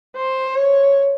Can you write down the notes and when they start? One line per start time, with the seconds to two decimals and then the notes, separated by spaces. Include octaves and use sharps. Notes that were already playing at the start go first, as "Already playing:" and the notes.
0.17 C5
0.56 C#5